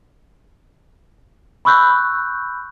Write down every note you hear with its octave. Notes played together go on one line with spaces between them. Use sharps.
B5 C#6 E6 F#6 G6